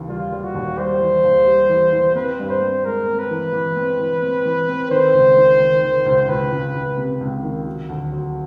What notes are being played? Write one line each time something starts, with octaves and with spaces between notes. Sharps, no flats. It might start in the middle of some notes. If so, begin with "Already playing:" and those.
Already playing: D#2 C#3 E3
G3 F4
G3
F#4
D#2
G3 C5
E3
D#2
G3
E3
E3
C4 B4
G2
C5
C4
G#3 A#4
C4
B4
E3
E3
C4
E3
C4
E3
C4
D#3 C5
C#2
D#3
D#3
D#3
C#2
C#2 B4
C#2
C#2
C3
C#2
D#3
F#3
D2
F#3